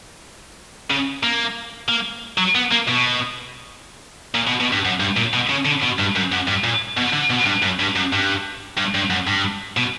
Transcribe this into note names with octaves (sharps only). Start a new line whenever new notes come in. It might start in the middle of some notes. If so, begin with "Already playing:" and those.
C#3
A#3
A#3
F#3
B3
A#3
B2
A#2
B2
B2
G2
F#2
G2
A#2
B2
C#3
D3
B2
G2
F#2
F#2
G2
A#2
B2
D3
B2
G2
F#2
G2
F#2
G2
G2
G2
F#2
G2
B2